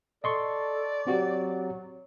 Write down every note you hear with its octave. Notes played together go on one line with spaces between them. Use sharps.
A4 D5 D#5 C6 C#6
F#3 C4 F#4 G4